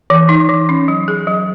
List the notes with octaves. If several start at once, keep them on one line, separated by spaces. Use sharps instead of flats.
E3
D#4
E3
C#4
F#3
G#4
F#3